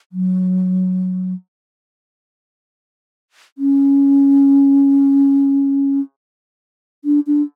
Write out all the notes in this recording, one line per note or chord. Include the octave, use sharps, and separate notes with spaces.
F#3
C#4
D4
D4